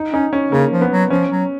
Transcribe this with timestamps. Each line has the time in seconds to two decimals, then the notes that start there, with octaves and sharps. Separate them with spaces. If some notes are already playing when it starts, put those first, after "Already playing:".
Already playing: D#4
0.13 C#4 D#4
0.33 C#4
0.52 C#3 A#3
0.72 F3
0.81 B3
0.91 F#3
1.10 F3 C#4
1.31 F#3